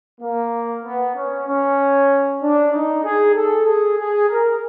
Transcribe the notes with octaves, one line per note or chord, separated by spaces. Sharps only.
A#3
B3
C#4
C#4
D4
D#4
G#4
A4
G#4
G#4
A#4